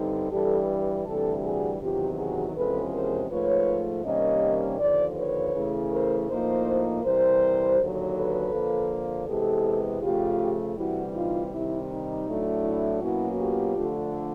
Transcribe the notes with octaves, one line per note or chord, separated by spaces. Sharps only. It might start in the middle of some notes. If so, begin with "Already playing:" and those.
Already playing: G2 D3 G3 C4 D#4
G2 E3 G3 G4 A4
D2 C3 E3 G3 G4 A4
F#4 G#4
E2 C3 D#3 F#3 F4 G4
F#4 G#4
E2 C3 F3 G#3 C#4 A4 B4
A#4 C5
G#2 F3 A3 B4 C#5
C3 D#3 G3 A#3 C#4 C#5 D#5
D#2 D3 F3 C5 D5
B4 C#5
C#3 E3 A3
A#4 C5
A2 F3 A#3 D#4 A#4 C5
C3 E3 G3 A#4 C5
D#2 D3 F#3
A4 B4
D3 F3 A#3
C3 E3 G#3 B3 G4 A4
C#3 F3 A3 F4 G4
D2 C3 E3 G3 E4 F#4
D#4 F4
C3 D#3 G3 E4
D#4
A2 F#3 A3 D4
E4
B2 F#3 A#3 C#4 E4 F#4
F4 G4
D3 F3 A3 D4